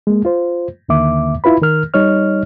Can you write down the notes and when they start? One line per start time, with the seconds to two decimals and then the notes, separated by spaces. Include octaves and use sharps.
0.07 G#3 A#3
0.25 F4 C5
0.89 D#2 D3 D#3 A#3 E5 D6
1.44 E4 F4 B4 B5
1.61 D#3 A#4 F6
1.94 G3 D#4 C#5 D#5 F6